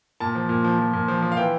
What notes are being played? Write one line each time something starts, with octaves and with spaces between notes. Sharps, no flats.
A#2 A5
F3
A#2
F3
F3
A#2
F3
F3
F5
E3 G5